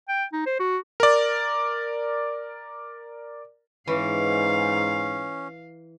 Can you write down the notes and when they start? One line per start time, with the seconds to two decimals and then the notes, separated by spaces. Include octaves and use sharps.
0.09 G5
0.33 D#4
0.46 C5
0.60 F#4
1.00 A#4 D5
3.87 G#2 E3 C#4 F5